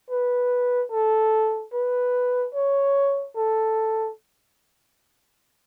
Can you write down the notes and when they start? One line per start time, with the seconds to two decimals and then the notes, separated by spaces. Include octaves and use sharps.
0.10 B4
0.91 A4
1.73 B4
2.54 C#5
3.36 A4